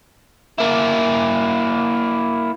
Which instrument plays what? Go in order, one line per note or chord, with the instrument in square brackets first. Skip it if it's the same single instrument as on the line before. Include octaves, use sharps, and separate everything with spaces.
[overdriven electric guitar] A#3 E4